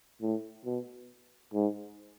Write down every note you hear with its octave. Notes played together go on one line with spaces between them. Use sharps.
A2
B2
G#2